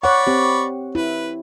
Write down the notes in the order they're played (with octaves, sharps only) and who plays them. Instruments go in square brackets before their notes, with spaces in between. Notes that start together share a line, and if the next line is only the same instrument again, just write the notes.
[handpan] C#5 F#5 [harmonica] D5 B5 C#6
[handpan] C4 G4
[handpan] E4 [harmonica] B4